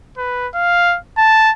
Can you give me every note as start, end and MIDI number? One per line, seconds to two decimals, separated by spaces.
0.18 0.48 71
0.54 0.97 77
1.18 1.52 81